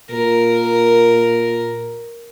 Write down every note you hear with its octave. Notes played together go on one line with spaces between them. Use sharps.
A#2 A#4